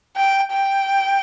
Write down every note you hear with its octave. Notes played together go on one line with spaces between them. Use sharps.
G5
G5